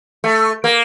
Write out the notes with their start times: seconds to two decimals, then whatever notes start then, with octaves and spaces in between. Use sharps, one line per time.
0.24 A3
0.64 A#3